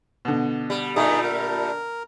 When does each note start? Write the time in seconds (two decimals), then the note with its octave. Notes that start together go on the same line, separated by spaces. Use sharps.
0.25 B2 D3
0.70 G3
0.96 A#2 G3 A3 D#4 G#4
1.23 A#4